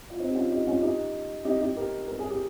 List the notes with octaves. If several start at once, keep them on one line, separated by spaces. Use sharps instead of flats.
F4
C4 D#4
G4
C#4 F4
D#4 G4
C#4 F4
D#4 G4
D#4 G4
D#4 G4
G4 A#4
A#4
G#4
G4